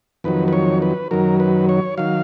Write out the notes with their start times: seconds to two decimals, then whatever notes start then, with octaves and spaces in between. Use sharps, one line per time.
0.24 F2 D#3 F#3 B4
0.48 B4
0.53 C#5
0.82 B4
1.11 F#2 D#3 F#3 A#4
1.40 B4
1.69 C#5
1.98 D#3 F#3 F5